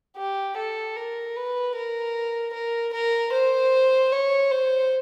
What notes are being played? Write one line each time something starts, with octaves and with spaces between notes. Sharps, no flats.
G4
A4
A#4
B4
A#4
A#4
A#4
C5
C#5
C5